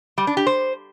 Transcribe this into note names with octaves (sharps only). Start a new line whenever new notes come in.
G3
D4
G4
C5